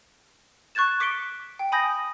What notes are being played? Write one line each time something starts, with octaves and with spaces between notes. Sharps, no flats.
C#6 F#6 G#6 A6 E7
D6 B6 C#7 D7 G7
G5
G#5 B5 D#6 G6 A#6